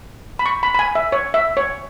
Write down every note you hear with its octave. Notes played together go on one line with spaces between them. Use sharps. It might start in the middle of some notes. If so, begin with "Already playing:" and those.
B5
C#6
B5
B5
G#5
E5
C#5
E5
C#5